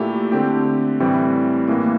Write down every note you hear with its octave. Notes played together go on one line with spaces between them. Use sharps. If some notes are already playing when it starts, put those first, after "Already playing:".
Already playing: A#2 A3 E4 G4
D3 A3 C4 G4
A2 E3 G3 C4
A2 E3 A#3